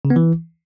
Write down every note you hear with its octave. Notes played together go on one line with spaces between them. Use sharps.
C#3
B3
E3